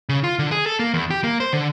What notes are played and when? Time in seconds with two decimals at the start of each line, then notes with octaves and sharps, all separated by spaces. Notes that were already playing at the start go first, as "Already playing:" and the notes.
0.09 C#3
0.24 F4
0.39 D3
0.52 G#4
0.66 A4
0.79 A#3
0.94 E2
1.10 G4
1.24 A#3
1.40 C5
1.53 D3